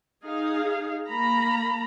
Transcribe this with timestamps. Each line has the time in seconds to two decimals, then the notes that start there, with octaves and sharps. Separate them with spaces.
0.24 D#4 G#4 F5
1.07 A#3 A#5 B5